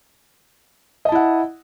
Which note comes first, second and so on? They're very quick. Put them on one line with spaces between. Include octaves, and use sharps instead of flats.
D#5 A5 E4 F#5